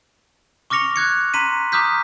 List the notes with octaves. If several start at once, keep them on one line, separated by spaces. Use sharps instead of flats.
C#6 D6 F6 A#6 C#7 F7
D6 F#6 G#6 C#7
A#5 C6 B6 D#7
A#5 D6 D#6 F6 G6 B6